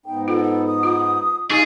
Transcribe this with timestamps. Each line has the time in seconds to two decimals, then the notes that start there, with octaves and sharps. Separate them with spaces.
0.06 G#2 B3 D#4 G5
0.28 F4 A4
0.66 D#6
0.83 F4
1.50 D#4 F4 G4 G#4 D#5 G#5 A6